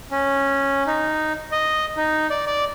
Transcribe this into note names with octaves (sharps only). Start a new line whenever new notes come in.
C#4
D#4
D#5
D#4
D5
D5